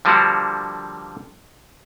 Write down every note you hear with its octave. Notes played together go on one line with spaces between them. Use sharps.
D3 F3 G3 A#3 D4 F#4